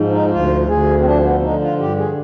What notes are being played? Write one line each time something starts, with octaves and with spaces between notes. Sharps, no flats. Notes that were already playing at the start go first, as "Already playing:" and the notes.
Already playing: G#2 F3
D#4
D2 F4
D2 G#4
C4
F3 D4
B3
D3 D#4
F4
G2 G4
G#4